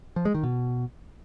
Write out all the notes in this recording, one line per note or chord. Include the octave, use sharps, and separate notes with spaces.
F3
G#3
D#3
B2